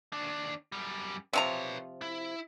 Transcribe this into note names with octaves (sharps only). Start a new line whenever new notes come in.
D#2 D4
F#2 G3
C3 F3 B4 C#5 A#5
E4